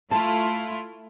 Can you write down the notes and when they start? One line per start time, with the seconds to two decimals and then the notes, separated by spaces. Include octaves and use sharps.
0.11 A3 E4 F4 A5